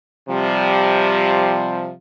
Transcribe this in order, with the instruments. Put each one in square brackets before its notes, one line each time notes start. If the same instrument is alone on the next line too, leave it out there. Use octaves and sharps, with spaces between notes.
[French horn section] C3 F3 G3